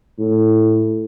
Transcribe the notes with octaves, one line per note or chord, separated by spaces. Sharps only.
A2